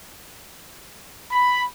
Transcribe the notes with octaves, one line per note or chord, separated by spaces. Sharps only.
B5